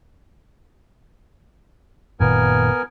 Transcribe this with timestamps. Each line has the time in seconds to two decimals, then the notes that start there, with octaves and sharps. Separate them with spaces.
2.20 F#1 A#2 D#3 B3 A#4 G#5